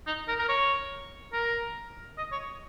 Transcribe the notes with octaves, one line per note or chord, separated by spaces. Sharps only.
D#4
A#4
A#4
C#5
A#4
D#5
C#5